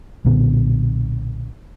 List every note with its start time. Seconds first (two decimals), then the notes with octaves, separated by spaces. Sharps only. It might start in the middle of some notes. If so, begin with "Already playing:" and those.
0.25 B1 A#2 D3 B3